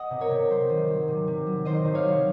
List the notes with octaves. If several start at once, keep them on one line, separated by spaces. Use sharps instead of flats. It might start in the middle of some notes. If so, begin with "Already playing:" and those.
Already playing: D#5 F#5
C3
A#4 C#5
C3
F#3 C5
D#3
F#3
C3
C3
F#3
D#3 C5 D#5
C3
C#5 F5
F#3